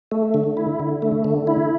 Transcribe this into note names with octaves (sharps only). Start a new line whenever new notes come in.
A3
D3
E4
D3
A3
D3
E4